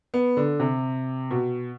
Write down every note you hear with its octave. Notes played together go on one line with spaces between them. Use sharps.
B3
D3
C3
B2